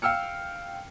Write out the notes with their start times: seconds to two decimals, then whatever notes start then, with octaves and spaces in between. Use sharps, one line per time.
0.02 F5 G5 E6 F6 C#7